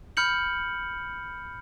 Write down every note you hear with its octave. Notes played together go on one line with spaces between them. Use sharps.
B5 F6 G6 C#7 F#7